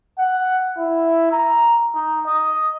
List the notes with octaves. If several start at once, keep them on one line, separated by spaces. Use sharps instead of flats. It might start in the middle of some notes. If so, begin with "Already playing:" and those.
F#5
E4
A#5
D#4
D#5